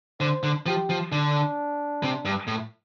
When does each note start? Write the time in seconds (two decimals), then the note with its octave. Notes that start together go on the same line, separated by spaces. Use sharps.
0.20 D3 C5
0.43 D3
0.66 F3 G4
0.89 F3
1.12 D3 D4
2.03 C3
2.25 G2
2.47 A2